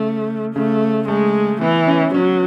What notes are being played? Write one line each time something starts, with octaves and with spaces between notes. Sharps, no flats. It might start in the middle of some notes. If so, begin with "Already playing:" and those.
Already playing: C#3 A3
C#3 A3
G#3 A3
E3 B3
C#4
F#3 C#4